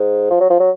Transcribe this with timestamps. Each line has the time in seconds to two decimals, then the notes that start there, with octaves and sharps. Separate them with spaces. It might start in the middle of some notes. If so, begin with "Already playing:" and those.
Already playing: G#2
0.30 F3
0.40 F#3
0.50 F3
0.60 F#3